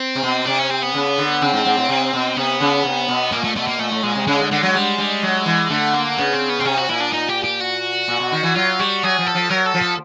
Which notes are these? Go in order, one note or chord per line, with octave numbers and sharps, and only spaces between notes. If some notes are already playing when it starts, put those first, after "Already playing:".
Already playing: C4
C3
B2
C3 D4
C#4
C4
B3
C#3
D3
C#3 C4
G#2
G#2
A2
C3
B2
C3 B3
C#3
C3
B2
A#2 A#3
A3
B2 A3
A#3
A#2 A3
A2
A#2 G#3
C3
C#3 G#3
D3
D3 G#3
F#3
G3
G3
F#3
E3
D3 A3
A#3
C#3 B3
C4
B3
B2 C4
C3 C#4
F#4
A#2 E4
D4
D#4
G4
G4
F#4
A#2
B2
D#3
E3
F#3 F4
G3 F#4
F#3 G#4
F3
A4
F3
F#3 A#4
A4
F3
A4